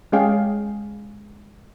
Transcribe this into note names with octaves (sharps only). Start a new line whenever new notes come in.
G#3 C#4 G#4 F5 G5